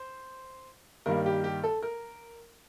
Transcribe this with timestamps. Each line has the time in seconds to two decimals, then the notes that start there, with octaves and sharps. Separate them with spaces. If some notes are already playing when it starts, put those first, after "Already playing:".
Already playing: C5
1.06 G2 D#3 G3 A#3 A#4
1.26 G4
1.44 G4
1.64 A4
1.83 A#4